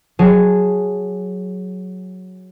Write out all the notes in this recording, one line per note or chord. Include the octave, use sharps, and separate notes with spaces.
F#3 G#4 A5